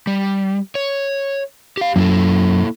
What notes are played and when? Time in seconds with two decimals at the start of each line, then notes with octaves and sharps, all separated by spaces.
0.07 G3
0.75 C#5
1.77 G4 F5
1.96 F#2 A#3 E4 A4